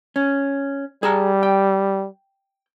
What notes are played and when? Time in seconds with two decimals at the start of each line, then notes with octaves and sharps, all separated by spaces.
0.16 C#4
1.03 G3 G#4 A5 A#5
1.43 G5